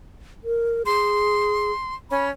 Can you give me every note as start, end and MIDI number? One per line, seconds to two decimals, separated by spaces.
0.44 0.83 70
0.86 1.72 68
0.86 1.95 84
2.11 2.30 61
2.11 2.25 83